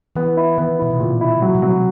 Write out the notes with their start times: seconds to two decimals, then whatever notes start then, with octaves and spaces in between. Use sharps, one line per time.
0.16 E3 B3
0.37 E4
0.58 D#3 B3
0.79 B2 E4
0.90 C3
1.00 A#2 C#3
1.21 E4
1.42 F#3
1.55 C3
1.62 F#3